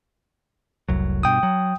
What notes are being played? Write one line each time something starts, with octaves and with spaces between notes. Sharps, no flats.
F1 C2 F#3
G2 B2 G5 D#6
F#3